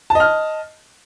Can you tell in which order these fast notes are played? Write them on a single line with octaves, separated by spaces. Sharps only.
A5 D#5 F6